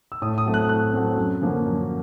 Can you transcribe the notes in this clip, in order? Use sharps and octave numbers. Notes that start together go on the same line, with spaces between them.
E6
A2 D#6
D#6
F#3 A3 C4
F#6
A2 F#6
F#3 A3 C4
F#2
D3 F3 A#3 C#4
F#2